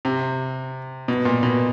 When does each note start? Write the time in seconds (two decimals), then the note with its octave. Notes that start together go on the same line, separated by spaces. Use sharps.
0.05 C3
1.08 B2
1.25 A#2
1.43 B2